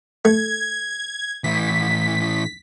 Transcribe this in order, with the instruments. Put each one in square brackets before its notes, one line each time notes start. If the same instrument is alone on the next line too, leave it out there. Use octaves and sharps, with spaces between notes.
[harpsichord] A3 [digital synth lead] G#6
[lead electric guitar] A2 E3 [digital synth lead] B6